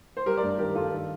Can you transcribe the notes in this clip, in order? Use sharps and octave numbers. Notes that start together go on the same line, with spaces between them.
C5
G3 G4 A#4
A#4 D5
G2
D#3 G4 A#4
G2 F4 A4
D#3